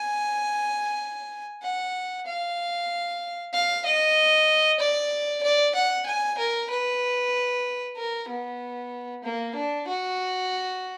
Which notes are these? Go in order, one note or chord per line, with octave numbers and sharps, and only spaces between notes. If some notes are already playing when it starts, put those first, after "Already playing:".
Already playing: G#5
F#5
F5
F5
D#5
D5
D5
F#5
G#5
A#4
B4
A#4
B3
A#3
D4
F#4